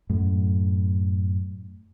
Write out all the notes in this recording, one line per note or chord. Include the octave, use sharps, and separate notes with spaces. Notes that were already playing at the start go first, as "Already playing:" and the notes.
F#2 A2